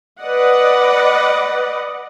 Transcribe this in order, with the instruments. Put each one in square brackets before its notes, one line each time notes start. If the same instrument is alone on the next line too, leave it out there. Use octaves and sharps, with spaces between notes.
[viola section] B4 D5 D#5 F#5